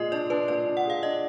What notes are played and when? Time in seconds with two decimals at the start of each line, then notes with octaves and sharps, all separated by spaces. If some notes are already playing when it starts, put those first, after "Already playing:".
Already playing: A#2 G#3 G#4 D5 D#5
0.12 D4 D5
0.30 D4 B4
0.48 A#2 D5
0.66 D4
0.77 F#5
0.85 G#4 F5
1.03 D4 D#5